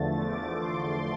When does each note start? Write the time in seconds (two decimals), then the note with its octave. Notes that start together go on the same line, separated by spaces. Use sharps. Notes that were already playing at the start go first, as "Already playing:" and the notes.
Already playing: E2 D3 F3 A3 A6
0.24 D6
0.60 C6